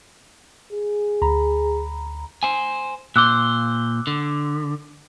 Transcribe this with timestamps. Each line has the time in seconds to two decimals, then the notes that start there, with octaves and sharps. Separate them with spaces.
0.73 G#4
1.22 D2 A#5 B5
2.43 C5 G#5
3.16 A#2 C5 D6 E6 F#6
4.07 D3